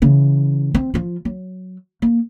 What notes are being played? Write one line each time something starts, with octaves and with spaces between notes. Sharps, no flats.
C#3 E3
C4
F3 F4
F#3
A#3